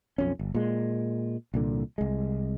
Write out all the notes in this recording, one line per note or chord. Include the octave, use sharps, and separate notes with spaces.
B1 F2 C#4
G1
A#2 G#3
C2 A#2 D3
C2 G#3